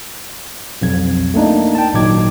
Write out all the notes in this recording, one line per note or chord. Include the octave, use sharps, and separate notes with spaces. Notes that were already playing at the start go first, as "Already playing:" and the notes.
B1 F2 G#6
A3 A#3 D4 D#4
G5 A5
G#1 A#2 F#3 D#4 D6 G#6